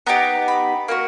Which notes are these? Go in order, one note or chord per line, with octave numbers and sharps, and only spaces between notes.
B3 D#4 G4 A#5
B5
A#3 D#4 F#4